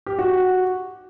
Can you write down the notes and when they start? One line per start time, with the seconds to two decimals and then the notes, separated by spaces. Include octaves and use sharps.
0.06 G4
0.19 F#4